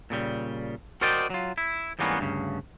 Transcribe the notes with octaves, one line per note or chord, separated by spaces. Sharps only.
A#2 C#3 G3
F#4 A#4 C5 D5 D#5 G5
F#3 F4
E4
G#2 E3 G3 A#3 B3 C#4
D2 G2 C#3